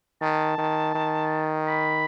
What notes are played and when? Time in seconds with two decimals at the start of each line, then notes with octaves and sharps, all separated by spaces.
0.22 D#3 A5
0.58 D#3
0.95 D#3
1.68 B5